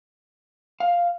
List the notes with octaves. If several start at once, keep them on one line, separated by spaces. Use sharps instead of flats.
F5